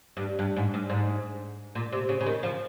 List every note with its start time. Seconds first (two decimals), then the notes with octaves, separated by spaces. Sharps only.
0.17 G2
0.39 G2
0.56 G#2
0.74 G2
0.90 G#2
1.75 A#2
1.92 C3
2.09 C#3
2.21 C#3
2.26 D#3
2.43 F3